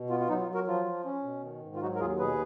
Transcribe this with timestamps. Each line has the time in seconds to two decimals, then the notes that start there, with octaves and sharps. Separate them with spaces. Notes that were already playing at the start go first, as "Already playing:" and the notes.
Already playing: B2
0.10 B3 F4
0.20 F4
0.29 F#3 D#4
0.42 F4
0.48 F#3
0.55 F#4 A#4
0.67 F3 F4
0.86 F3
1.05 C#4
1.24 B2
1.43 D#3
1.62 G#2
1.76 F4
1.81 F#3 D#4 F#4
1.96 A#4
2.00 D#2 F4 G#4
2.19 B2 G#4 B4